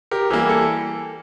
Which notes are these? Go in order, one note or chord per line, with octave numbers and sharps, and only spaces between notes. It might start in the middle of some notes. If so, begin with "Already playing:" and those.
G4 A#4
E3 G3 A#3 G4
A4